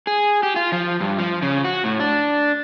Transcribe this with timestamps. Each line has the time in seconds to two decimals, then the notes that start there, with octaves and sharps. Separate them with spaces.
0.07 G#4
0.43 G4
0.56 F4
0.72 F3
1.00 G2
1.18 F3
1.42 C#3
1.64 F#4
1.84 A2
2.00 D4